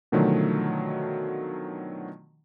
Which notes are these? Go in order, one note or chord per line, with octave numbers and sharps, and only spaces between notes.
B2 D3 D#3 F3 F#3 A3